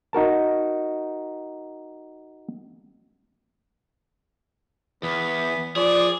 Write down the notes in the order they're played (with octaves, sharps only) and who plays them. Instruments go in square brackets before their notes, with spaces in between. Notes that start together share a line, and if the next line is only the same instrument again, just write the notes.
[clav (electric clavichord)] D#4 F#4 A#4 A5
[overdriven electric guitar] E2 [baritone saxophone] B3
[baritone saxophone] F3 [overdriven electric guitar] G#4 [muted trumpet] D5